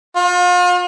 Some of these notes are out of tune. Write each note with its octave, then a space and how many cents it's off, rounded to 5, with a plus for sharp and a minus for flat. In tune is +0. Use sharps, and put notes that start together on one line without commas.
F4 +40